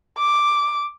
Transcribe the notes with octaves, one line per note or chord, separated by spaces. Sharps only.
D6